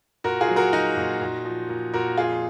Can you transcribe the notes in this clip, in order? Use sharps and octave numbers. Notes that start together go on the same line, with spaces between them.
A#2 F#4 A#4
F4 G#4
F#3
F#4 A#4
F#3 D#4 F#4
A#2
A#2
F3
A#2
A#2 F#4 A#4
F2 F4 G#4